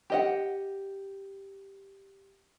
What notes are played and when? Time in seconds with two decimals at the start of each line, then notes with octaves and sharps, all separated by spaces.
0.10 G4 D#5 F#5